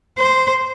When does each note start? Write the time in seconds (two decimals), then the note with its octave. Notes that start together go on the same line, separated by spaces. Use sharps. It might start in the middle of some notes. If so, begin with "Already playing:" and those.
0.18 C5